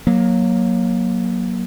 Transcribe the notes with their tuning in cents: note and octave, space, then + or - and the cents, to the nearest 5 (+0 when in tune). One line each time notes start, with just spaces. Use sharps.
F#3 -10 A#3 +15